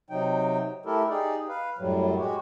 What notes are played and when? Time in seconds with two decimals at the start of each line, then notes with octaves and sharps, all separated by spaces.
0.10 C3 F#3 D#4 G5
0.86 A3 E4 G4 A4 A#4
1.09 D#4 G4 G#4 D5
1.49 B4 F5
1.78 F#2 A2 F#3 G3
2.18 G#3 F#4 G4